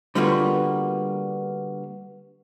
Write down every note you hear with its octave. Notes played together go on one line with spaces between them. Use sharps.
D3 G3 A#3 B3 F4 F#4